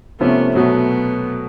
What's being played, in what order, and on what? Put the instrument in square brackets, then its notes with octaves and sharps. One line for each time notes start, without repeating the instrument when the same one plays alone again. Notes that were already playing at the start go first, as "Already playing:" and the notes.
[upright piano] C3 F3 A3 C#4 [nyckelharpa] B3
[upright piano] B2 F#3 A3 [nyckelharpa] B3